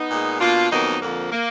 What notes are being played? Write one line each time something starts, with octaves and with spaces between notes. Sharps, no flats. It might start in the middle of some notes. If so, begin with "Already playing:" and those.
Already playing: B3 D#4
A#2 G#3
B2 A#3 D4 F4
F2 D#3 F#3 A#3 B3 D#4
F2 D3 F3 A#3
A#3